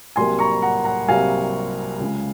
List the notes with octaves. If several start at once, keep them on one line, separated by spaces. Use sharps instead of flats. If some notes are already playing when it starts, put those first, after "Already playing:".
C2 C3 F#3 A#3 G#5 C6
A#5 C#6
F#5 A#5
F#5 A#5
C2 C3 F#3 A#3 F5 G#5
C#2 C#3 G#3